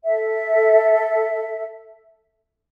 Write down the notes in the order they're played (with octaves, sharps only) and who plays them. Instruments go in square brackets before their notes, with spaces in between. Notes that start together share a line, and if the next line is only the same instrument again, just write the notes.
[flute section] A4 E5